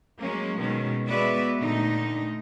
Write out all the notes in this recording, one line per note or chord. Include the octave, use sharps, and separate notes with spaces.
F#3 G#3 A#3 C#4
B2 D#3 G#3 C#4
G#3 B3 F#4 B4 D5 E5
A#2 D3 D#3 A3 D#4